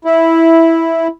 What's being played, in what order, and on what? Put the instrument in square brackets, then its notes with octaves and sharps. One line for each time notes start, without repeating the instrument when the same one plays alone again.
[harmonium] E4